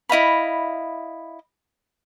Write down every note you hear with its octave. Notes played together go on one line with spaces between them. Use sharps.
E4 D#5 F5 B5